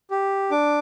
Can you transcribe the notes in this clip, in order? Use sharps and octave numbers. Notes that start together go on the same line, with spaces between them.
G4
D4 D6